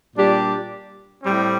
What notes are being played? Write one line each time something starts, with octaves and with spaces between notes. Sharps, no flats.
A#2 G3 D4 G4 D5
A2 G3 C4